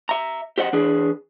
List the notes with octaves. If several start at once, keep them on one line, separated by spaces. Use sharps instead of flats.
E5 A#5
G4 C5 D#5 F#5
E3 D4 G#4